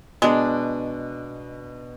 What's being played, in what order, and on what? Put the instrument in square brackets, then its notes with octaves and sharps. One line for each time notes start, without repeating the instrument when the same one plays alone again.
[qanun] B2 D4 [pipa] G#3